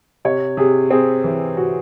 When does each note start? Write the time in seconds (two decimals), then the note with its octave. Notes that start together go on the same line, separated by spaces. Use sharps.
0.25 C3 C#5
0.57 C3 G#4
0.90 C4 G#4
1.24 E3
1.57 C3 F#4